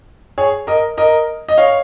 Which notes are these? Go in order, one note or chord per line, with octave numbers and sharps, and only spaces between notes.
G#4 C#5
A#4 D#5
A#4 D#5
D#5
C#5 F5